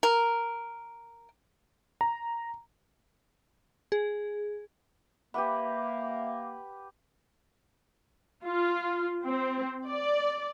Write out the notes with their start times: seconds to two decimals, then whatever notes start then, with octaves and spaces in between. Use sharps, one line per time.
0.03 A#4
2.01 A#5
3.92 G#4
5.34 A#3 G4 B4 E5 F#5 B5 D6
8.43 F4
9.25 C4
9.88 D5